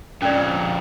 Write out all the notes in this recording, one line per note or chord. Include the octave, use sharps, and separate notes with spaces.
F2 A#2 C#4 D5